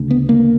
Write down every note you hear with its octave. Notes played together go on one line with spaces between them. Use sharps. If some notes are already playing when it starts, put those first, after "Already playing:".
Already playing: D2 C#3
B3
A#3